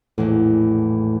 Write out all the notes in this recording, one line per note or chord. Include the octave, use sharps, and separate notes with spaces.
A#1 E2 A2